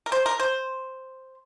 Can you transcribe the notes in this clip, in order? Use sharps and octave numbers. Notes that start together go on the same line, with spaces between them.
A#4
C5
A#4
C5